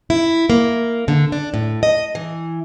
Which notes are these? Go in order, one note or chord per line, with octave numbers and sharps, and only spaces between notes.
E4
A#3
D3
D4
A2
D#5
E3